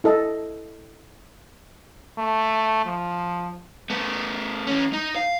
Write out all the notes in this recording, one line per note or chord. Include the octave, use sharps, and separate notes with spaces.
E4 A4 D#5 A5
A3
F3
A3 B3
E3 C#4
D#4
F5